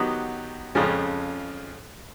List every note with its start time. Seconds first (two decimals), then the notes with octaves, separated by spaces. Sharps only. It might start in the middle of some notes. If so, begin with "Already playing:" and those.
Already playing: D#3 F#3 B3 D#4 G4
0.75 F2 C#3 F3 G#3 C#4